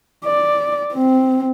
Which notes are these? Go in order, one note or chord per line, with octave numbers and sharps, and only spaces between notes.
D5
C4